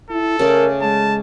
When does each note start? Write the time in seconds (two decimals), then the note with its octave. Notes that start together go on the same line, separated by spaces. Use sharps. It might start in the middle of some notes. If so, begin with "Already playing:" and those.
0.10 E4 A4
0.39 C#3 A3 A#4 D5
0.82 G#3 A5